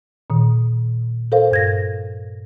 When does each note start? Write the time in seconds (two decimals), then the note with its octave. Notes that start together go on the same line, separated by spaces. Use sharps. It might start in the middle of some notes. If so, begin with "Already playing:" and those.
0.30 A#2 D#3
1.32 A4 A#4 C5 F5
1.51 G2 G#6 A#6